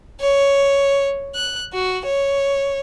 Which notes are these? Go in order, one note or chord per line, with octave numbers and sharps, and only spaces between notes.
C#5
F#6
F#4
C#5